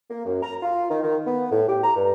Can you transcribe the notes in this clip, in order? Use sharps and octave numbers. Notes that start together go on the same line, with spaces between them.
A#3
F#2
A#5
F4
D#3
D#3
B3
A2
G4
A#5
G2